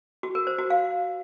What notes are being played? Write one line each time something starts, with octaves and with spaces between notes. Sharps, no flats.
F#4
A#4
C5
F#4
F5